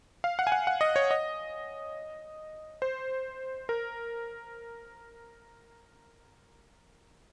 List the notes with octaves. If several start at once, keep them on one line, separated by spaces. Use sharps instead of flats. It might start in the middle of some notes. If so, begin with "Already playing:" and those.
F5
F#5
G#5
F#5
F#5
D#5
C#5
D#5
C5
A#4